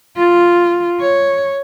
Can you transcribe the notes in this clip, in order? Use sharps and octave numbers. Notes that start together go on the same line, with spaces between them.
F4
C#5